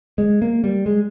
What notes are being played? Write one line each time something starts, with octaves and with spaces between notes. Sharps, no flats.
G#3
A#3
G3
G#3